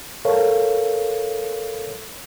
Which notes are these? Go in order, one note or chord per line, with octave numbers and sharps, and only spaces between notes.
A4 A#4 C#5 F5